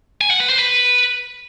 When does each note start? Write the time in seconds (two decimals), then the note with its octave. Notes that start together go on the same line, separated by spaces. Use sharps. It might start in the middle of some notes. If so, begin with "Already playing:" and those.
0.21 G#5
0.30 F#5
0.40 B4
0.49 C5
0.59 B4